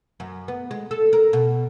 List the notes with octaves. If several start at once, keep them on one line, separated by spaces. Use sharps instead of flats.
F#2
B3
G#3
A4
A#4
B2